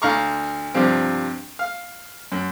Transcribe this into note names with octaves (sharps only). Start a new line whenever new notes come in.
D2 D3 F5 A#5 C#6
G2 C3 F3 C4
F5
F#2